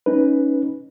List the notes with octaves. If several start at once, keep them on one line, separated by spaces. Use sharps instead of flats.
C#4 D#4 B4